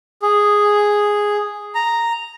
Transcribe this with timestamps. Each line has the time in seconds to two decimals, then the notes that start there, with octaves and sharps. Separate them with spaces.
0.22 G#4
1.75 A#5